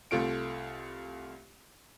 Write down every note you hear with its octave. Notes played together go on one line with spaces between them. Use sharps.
C2 A3 F4 D7